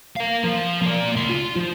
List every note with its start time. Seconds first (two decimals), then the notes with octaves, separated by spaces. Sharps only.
0.17 A#4 F5
0.45 F3
0.82 A#3 D5
1.16 C#2 C6
1.29 F4
1.56 F3